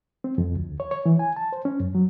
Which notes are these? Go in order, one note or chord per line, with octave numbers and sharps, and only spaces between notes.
C4
F2
D2
C#5
C#5
E3
G#5
A5
C5
C#4
F#2
F#3